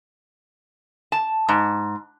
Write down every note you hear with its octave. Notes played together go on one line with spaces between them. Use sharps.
A5
G#2